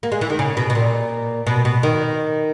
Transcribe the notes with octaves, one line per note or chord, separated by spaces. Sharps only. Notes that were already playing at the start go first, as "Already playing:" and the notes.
A#3
G#3
E3
D#3
C#3
B2
B2
A#2
B2
B2
D#3